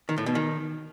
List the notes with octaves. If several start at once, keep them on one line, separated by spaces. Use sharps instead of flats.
D#3
A2
B2
D#3